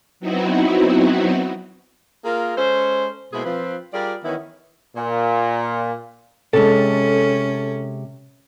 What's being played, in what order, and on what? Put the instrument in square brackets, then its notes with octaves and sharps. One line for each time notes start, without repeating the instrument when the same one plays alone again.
[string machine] F#3 B3 C4 D#4 E4 F#4
[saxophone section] A#3 F4 G#4 A#4
G#3 C#4 A4 C5
B2 G#3 A#3 C4 E4 G#4
F3 C4 B4
G3 F4 G#4 A#4 D5
D#3 E3 B3 C#4 D#4 E4
[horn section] A#2
[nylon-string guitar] C3 G#3 [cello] C#4 [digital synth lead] A4